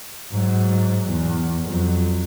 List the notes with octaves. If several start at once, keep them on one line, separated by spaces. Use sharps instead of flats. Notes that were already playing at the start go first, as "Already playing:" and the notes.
G#2 F#3
E2
F2 F#3